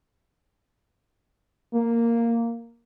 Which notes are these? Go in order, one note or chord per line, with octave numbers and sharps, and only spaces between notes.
A#3